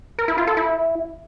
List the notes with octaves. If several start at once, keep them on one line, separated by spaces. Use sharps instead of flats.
A#4
E4
F4
A4
E4